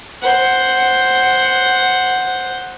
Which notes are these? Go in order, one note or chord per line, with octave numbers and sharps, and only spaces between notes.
C5 F#5